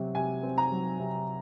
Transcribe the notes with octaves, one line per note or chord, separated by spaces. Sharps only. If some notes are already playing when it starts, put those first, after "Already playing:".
Already playing: C3 F#3 C4
C3 G#5
C4
A#5
F#3
C3